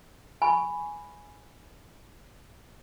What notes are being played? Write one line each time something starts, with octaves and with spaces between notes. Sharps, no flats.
G#5 B5 C#6